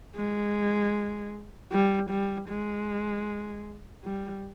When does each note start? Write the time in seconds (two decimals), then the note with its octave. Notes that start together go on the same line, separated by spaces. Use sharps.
0.17 G#3
1.72 G3
2.10 G3
2.49 G#3
4.04 G3